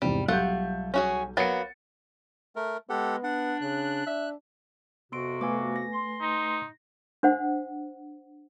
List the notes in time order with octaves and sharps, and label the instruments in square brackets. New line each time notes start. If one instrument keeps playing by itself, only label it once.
[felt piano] E2 G#2 C3 [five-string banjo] G3
[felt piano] B1 G3 G6 [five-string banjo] A3 F4 F#5
[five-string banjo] C#4 F#4 G#4
[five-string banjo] F#3 A#3 B3 [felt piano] A6 C#7
[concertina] A3 A#4
[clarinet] G#3 [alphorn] B3 [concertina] G4 A4 F#5
[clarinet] D4 [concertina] F#5
[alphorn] C#3 [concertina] F#6
[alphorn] D4 [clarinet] E5
[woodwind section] F2 C3 F#4 [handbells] B3 C6 D7
[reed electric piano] A3 B4 G#5 [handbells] B3 F5 D6
[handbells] A#6
[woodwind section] C6
[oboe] D#4
[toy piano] D4 C5 F#5